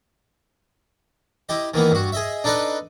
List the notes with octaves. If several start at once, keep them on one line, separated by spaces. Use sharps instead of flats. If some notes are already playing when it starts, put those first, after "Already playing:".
E4 G4 D#5
D#3 E3 A#3 B3
G2 F#4
G#4 D#5 E5
D4 D#4 A4 B4 D5 D#5